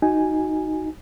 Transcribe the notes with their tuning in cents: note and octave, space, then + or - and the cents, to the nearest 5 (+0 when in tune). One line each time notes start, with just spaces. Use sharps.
D#4 +0 F#4 +0 G#5 +0